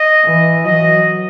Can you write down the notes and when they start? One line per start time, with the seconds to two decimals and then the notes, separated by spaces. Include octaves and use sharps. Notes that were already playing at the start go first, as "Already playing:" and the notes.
Already playing: D#5
0.25 E3
0.64 F#3 D#5